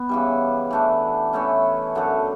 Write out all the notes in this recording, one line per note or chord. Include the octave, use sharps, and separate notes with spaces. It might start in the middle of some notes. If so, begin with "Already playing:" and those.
Already playing: B3
C#3 E3 G3
E3 A3 D4
E3 A3 C#4
F#2 D3 A3